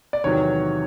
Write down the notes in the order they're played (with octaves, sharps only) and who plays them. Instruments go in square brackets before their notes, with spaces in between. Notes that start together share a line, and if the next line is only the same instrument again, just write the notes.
[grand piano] D5
E2 C3 D#3 F#3 C#5